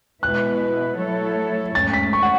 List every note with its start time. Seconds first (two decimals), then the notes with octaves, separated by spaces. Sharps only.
0.22 B2 G#3 B3 E4 B4 F#6
0.98 F#3 A3 E4 A4 C#5
1.75 G#2 F#3 A3 C#4 A6
1.94 B6
2.13 C#6
2.22 F#5